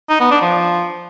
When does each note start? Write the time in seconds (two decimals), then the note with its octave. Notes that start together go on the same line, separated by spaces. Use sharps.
0.10 D#4
0.20 B3
0.31 D4
0.41 F3